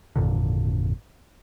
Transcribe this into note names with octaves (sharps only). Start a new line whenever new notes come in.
G#1 F2 A#2 D3